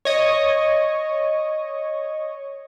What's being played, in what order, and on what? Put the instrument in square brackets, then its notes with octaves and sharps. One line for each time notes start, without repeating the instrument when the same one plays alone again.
[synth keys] C#5 D#5